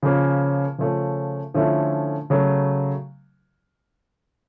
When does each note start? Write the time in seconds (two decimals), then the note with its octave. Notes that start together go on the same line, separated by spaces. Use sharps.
0.02 C#3 F3 A#3 C#4
0.78 C#3 F3 A3 C#4
1.54 D3 F3 A3 C#4 E4
2.30 C#3 F#3 A3